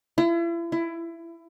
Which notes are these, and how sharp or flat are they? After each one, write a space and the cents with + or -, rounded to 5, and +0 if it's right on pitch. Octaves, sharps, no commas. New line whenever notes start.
E4 +40
E4 +20